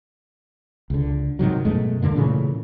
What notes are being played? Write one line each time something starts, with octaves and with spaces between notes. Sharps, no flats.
C#2 D3
G#2 C3 D#3 F#3
F#2 B2 G#3 A3
D2 G2 D3 A#3
A#2 C#3 E3 A3